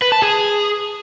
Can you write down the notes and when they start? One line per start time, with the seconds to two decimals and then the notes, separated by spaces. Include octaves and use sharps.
0.02 B4
0.12 A5
0.22 G#4